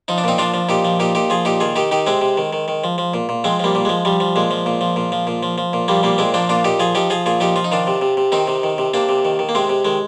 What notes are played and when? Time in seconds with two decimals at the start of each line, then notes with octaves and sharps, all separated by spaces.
0.08 F3 D#4
0.18 D4
0.24 A#2 C4 D#4
0.38 F3 D4 F4
0.54 F3
0.69 A#2 D#4 G4
0.85 F3
1.00 A#2 D#4 G4
1.15 A#2 D#4 G4
1.30 F3 F4 G#4
1.45 A#2 D#4 G4
1.60 D#3 F4 G#4
1.76 D#3 D#4 G4
1.91 D#3 D#4 G4
2.07 C3 G#3 C4
2.21 C3
2.37 D#3
2.53 D#3
2.68 D#3
2.84 F3
2.98 F3
3.14 A#2
3.29 A#2
3.44 F3 G#3 C4
3.59 F3 G3 A#3
3.75 A#2
3.85 F3 G#3
4.05 F3 G3
4.20 F3
4.36 A#2 G#3
4.51 F3
4.66 A#2
4.81 F3
4.96 A#2
5.12 F3
5.27 A#2
5.43 F3
5.58 F3
5.73 A#2
5.88 F3 G3 A#3
6.03 A#2 G3 A#3
6.18 A#2 G#3 C4
6.34 F3 A#3 D4
6.49 A#2 D4 F4
6.64 A#2 D#4 G4
6.80 F3 F4 G#4
6.95 F3 D#4 G4
7.10 F3 F4 G#4
7.26 A#2 F4 G#4
7.40 F3 D#4 G4
7.56 F3 F4
7.64 D#4
7.72 D#3 D4 F4
7.87 C3
8.01 C3
8.17 C3
8.32 D#3 C4 D#4
8.47 C3
8.63 D#3
8.78 C3
8.94 C3 A#3 D4
9.09 C3
9.25 D#3
9.39 D#3
9.49 A#3
9.55 C3 G#3 C4
9.69 C3
9.85 D#3 G#3